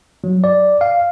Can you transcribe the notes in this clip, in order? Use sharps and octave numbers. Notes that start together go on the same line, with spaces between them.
F#3
D5
F5